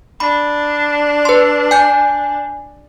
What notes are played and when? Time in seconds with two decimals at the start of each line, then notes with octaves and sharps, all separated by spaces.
0.20 D4 B5
1.25 B4 C6
1.71 G#5 G6